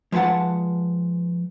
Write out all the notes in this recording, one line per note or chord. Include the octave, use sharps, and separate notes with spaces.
F3 G#3 B4 F#5 A5